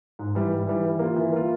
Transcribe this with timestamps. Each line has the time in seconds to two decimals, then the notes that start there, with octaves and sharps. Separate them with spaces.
0.19 G#2
0.35 E3 G3
0.51 G#2
0.67 E3 G3
0.84 E3
0.99 A#3
1.04 F4
1.16 E3
1.33 A#3 F4